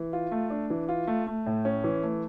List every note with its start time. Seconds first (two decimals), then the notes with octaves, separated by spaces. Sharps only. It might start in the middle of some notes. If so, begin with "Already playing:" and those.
Already playing: E3
0.13 F4
0.31 A3
0.50 D4
0.70 E3
0.89 F4
1.07 A3
1.27 A3
1.46 A2
1.65 C#4
1.84 E3
2.03 A3